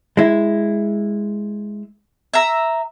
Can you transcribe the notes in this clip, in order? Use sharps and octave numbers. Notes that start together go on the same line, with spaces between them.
G#3 E4
E5 A#5